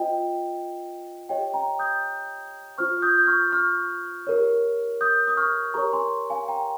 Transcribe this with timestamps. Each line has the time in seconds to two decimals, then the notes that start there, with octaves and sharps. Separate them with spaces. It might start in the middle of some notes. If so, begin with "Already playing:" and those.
Already playing: F4 C5 D#5 G5
1.29 G4 C#5 D#5 G5
1.54 G5 A#5
1.79 D#6 G6
2.78 F4 C5 C#6 F6
3.02 D#6 G6
3.18 G6
3.27 C#6 F6
3.52 C#6 F6
4.27 G4 A#4 C#5
5.01 D#6 G6
5.27 D#6
5.37 C#6 F6
5.74 G4 A#4 C#5 A#5 C#6
5.93 G#5 C6
6.30 F5 G#5
6.48 G5 A#5